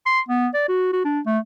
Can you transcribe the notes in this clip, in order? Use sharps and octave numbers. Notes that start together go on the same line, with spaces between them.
C6
B3
D5
F#4
F#4
D4
A3